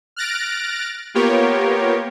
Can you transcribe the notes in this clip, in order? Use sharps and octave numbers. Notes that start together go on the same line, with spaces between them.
F6 F#6 A6 A#6 D7
A#3 B3 F4 G4 A#4 C#5